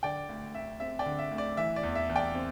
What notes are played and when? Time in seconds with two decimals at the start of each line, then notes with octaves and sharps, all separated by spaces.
0.03 D3 D5 G5
0.29 D2
0.55 D2 E5
0.80 C4 E5
0.99 D5 G5
1.06 D3
1.19 E5
1.31 D2
1.38 D5
1.57 E3 E5
1.76 D5
1.83 E2
1.95 E5
2.09 E2
2.16 D5 G5
2.35 C4